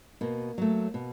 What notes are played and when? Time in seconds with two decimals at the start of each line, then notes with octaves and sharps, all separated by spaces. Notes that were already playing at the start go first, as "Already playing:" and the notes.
0.21 B2 A#3
0.58 F#3 A3
0.94 B2